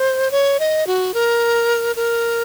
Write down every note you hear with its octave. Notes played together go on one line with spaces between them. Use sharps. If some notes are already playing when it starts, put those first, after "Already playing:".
Already playing: C5
C#5
D#5
F#4
A#4
A#4